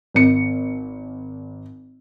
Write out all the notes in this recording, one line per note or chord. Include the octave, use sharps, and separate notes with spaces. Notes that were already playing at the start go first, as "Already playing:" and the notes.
G#1 C#7